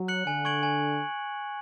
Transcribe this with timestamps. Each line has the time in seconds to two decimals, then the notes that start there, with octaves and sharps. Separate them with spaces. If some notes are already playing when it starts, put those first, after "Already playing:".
Already playing: F#3
0.08 F#6 C#7 F#7
0.26 D3 G#5
0.45 C#6 G#6 D7 F#7
0.63 G#5